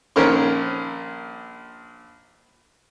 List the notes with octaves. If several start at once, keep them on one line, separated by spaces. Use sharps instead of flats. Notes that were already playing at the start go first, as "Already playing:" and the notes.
A#1 D#3 C#4 A#4 C5 C#6